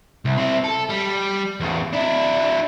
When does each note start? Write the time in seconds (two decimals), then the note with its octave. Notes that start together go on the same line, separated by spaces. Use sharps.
0.25 C2
0.37 C4 E4
0.64 A4
0.89 G3
1.60 E2 C#3
1.93 D4 E4